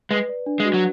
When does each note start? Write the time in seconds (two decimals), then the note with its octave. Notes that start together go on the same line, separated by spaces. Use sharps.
0.10 G#3 B4
0.29 D5
0.46 D4
0.60 G#3
0.65 F#4
0.74 F#3